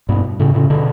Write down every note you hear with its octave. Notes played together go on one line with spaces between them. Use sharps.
G2 B2
A2 C#3
A2 C#3
B2 D3